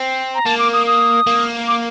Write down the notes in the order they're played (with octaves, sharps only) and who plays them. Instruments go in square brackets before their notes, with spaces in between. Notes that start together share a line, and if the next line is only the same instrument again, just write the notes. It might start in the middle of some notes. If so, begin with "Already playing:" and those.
Already playing: [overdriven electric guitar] C4
[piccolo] A#5
[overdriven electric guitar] A#3 [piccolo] A5
[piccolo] D6
D#6
D#6
[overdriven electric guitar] A#3
[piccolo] D6